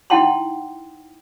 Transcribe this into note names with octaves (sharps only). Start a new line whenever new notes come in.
D#4 E4 F#5 G5 A5 C6